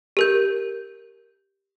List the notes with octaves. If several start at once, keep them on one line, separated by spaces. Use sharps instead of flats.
G4 A#4 G6